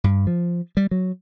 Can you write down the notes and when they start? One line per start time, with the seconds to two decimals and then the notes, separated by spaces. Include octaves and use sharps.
0.04 G2
0.27 F3
0.77 G3
0.91 F#3